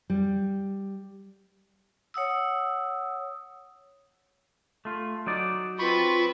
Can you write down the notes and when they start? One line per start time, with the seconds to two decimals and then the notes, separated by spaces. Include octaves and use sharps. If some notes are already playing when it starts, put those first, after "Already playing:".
0.10 G3
2.14 C#5 F#5 D#6 E6
4.85 A3 F4
5.27 F#3 D#4 D5
5.79 C4 F4 B4 B5 C#6